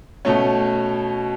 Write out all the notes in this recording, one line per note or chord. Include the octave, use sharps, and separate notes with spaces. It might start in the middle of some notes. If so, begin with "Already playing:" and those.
B2 A3 C#4